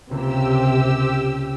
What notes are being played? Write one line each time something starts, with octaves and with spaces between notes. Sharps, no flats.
C#2 C3 A#3 G4 E6